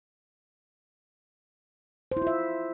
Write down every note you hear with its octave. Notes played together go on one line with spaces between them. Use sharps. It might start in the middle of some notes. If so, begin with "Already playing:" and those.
C5
E4
F4
E5